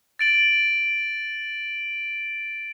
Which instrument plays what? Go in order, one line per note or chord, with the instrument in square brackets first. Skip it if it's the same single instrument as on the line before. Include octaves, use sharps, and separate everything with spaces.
[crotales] A6 D7 F#7